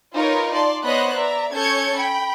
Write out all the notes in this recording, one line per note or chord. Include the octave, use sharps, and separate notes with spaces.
D#4 F4 A#4 B4 C#5
D5 A5 C6
B3 C5 C#5 D#5 B5 F#6
D5 E5 A#5
C#4 A4 C#5 G6 G#6 C#7
G5 B5